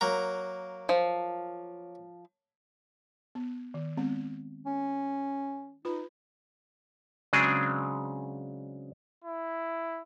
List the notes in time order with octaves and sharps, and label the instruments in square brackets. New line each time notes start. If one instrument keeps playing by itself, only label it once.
[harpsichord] F#3 A#3 A#5
[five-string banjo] F3
[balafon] B3
D#3
G#3 B3 C4
[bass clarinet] C#4
[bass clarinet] D#4 [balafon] F4 B4 B5
[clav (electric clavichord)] C#3 F#3 G#3 C4 D4 G#4
[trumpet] E4